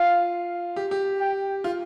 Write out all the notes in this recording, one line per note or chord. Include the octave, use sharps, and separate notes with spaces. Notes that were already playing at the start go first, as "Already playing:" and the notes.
Already playing: F4 F5
G4
G4
G5
F4